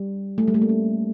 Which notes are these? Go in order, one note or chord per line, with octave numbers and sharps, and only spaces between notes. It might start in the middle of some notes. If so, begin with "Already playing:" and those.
Already playing: G3
A3
G3
A3
A#3
C#4